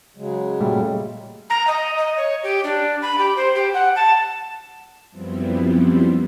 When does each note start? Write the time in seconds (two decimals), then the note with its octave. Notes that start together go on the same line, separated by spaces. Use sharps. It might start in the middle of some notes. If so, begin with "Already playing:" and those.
0.16 C#3 F#3 G#3
0.60 A#2 G3 A3
1.50 A#5
1.67 D#5
1.98 D#5
2.17 C#5
2.43 G4
2.64 D4
3.02 B5
3.18 G4
3.37 C5
3.56 G4
3.74 F#5
3.96 A5
5.11 F#2 F3 G3 B3 C4 E4